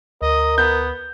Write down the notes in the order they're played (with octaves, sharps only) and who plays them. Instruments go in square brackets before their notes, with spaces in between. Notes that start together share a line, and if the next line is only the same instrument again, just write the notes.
[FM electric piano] D2 [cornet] A#4 [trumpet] D#5
[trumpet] B3 [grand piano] G6